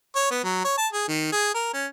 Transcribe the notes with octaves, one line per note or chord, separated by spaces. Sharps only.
C#5
B3
F#3
C#5
A5
G#4
D#3
G#4
A#4
C#4